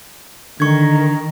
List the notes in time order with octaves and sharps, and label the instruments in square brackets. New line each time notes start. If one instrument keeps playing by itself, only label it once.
[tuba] D3 [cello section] D#3 [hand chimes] C#6 G#6